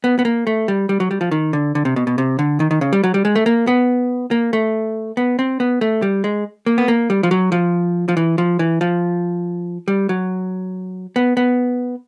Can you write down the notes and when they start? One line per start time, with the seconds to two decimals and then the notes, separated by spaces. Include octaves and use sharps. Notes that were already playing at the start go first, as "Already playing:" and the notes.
0.04 B3
0.19 B3
0.25 A#3
0.47 A3
0.68 G3
0.89 G3
1.00 F#3
1.11 G3
1.21 F3
1.31 D#3
1.53 D3
1.75 D3
1.85 C3
1.96 B2
2.07 B2
2.18 C3
2.39 D3
2.60 D#3
2.71 D#3
2.81 C#3
2.93 G3
3.04 F#3
3.14 G3
3.25 G#3
3.36 A3
3.46 A#3
3.67 B3
4.31 A#3
4.53 A3
5.17 B3
5.39 C4
5.60 B3
5.81 A3
6.02 G3
6.24 G#3
6.66 A#3
6.78 B3
6.88 A#3
7.10 G3
7.23 F3
7.31 F#3
7.52 F3
8.08 F3
8.17 E3
8.38 F3
8.59 E3
8.81 F3
9.88 G3
10.09 F#3
11.16 B3
11.37 B3